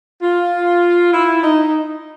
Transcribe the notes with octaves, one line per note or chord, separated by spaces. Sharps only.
F4
E4
D#4